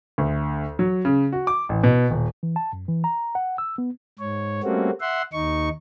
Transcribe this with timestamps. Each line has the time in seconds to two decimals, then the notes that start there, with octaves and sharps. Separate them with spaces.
0.18 D2
0.79 F#3
1.05 C#3
1.32 F#4
1.47 D6
1.69 A1
1.84 B2
2.11 D#1
2.43 E3
2.56 A5
2.73 F#2
2.89 E3
3.04 A#5
3.35 F#5
3.58 E6
3.78 B3
4.19 G#2 C#5
4.64 G3 A3 A#3 C4 C#4 F#4
5.01 E5 F#5 C6
5.33 D#2 D#4 C#6